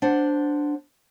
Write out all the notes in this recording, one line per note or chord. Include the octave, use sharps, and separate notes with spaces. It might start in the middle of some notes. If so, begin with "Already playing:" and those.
D4 C5 F#5